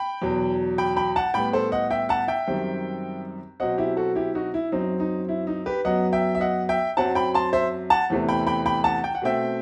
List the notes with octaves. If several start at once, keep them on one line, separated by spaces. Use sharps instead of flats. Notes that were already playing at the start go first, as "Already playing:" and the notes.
Already playing: G5 B5
E2 B2 F#3
G5 B5
G5 B5
F#5 A5
A2 G3 B3 G5 B5
A4 C5
D#5 F#5
E5 G5
F#5 A5
E5 G5
F#2 D#3 G3 C4
B2 F#3 C4 D#5 F#5
E4 G4
F#4 A4
E4 G4
D#4 F#4
E4
F#2 F#3 C4 D#4
D#4
E4
D#4
G4 B4
F#2 F#3 B3 D#5 F#5
E5 G5
E5
D#5 F#5
E5 G5
F#2 F#3 C4 F#5 A5
G5 B5
A5 C6
C5 E5
F#5 A5
E2 C3 E3 A3 C4
G5 B5
G5 B5
G5 B5
F#5 A5
G5
F#5
B2 A3 C4 E5 G5